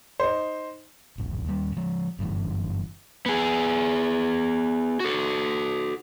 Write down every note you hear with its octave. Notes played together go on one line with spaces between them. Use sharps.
D#4 C5
D1 A#1
D#2 G3
F3 G#3
F#1 G2 E3
B3 G#4
F#4 A4